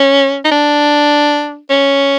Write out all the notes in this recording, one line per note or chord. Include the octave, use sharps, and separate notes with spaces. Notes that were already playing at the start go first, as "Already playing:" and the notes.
Already playing: C#4
D#4
D4
C#4